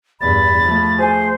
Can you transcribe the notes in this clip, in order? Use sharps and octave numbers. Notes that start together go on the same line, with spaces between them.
E2 G2 B5 A6
F3 A3
G#4 C5 G#5